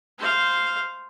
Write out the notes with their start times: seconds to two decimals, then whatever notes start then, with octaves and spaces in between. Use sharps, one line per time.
0.19 C5 F5